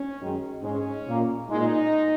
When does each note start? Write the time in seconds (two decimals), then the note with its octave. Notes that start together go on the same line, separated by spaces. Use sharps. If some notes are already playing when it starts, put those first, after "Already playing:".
Already playing: C#4
0.19 F#2 D#3 G#3
0.62 G#2 G#3 C#4
1.06 A#2 A#3
1.49 A#2 G#3 D#4